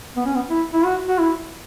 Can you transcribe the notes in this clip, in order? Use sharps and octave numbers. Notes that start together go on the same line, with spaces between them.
B3
C#4
B3
E4
E4
F#4
F#4
E4